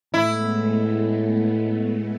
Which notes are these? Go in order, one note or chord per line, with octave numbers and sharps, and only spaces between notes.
A2 G#3 A3 B3 E4